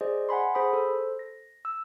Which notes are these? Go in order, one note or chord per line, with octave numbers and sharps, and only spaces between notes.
G#4 C5 D5 D#5
F#5 G#5 B5 C6
G#4 C5 B5 D#6
A4 C5
A#6
E6